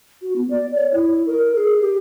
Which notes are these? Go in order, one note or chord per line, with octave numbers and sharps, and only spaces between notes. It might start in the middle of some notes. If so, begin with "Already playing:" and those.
F#4
B3
D5
C#5
E4
A#4
G#4
G4